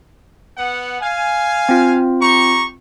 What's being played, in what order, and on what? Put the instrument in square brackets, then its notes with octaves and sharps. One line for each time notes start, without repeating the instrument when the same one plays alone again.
[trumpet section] B3 F#5
F5 G#5
[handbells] C4 F4
[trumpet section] G4 A#5 C#6